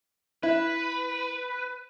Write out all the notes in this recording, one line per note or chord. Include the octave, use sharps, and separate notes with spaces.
E4 B4